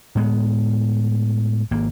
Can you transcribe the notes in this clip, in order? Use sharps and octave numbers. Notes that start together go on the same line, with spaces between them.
A2 G#3 B3
G#1 A#3